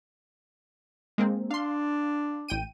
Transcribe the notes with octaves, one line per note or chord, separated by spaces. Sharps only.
G#3 A#3 C4
D4 F5 C6
A1 G5 D#7